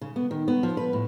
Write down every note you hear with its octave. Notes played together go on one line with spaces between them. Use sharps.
C#3
B3
D#3
B3
F3
B4
A2